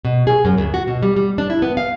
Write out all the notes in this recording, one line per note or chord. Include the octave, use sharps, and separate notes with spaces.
B2
G#4
F#2
D2
F#4
B2
G3
G3
D4
E4
B3
F5